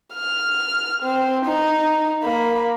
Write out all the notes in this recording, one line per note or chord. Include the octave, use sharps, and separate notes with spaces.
F6
C4
D#4
A#3 B5